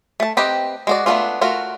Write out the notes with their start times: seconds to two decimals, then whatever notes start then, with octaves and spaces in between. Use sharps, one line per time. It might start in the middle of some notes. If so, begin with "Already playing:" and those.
0.20 A3 A5
0.37 C4 G4 B4 D#5 A#5
0.87 G#3 F#4 D5
1.06 A3 B3 C#4 D4 F4
1.41 A3 F4 F#4 A#4